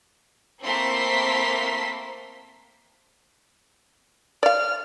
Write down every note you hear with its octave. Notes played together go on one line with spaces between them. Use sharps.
A3 A#3 C4 E4 C6 B6
D5 F5 F6